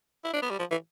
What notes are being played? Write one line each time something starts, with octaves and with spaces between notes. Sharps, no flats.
E4
D4
B3
G3
F3
E3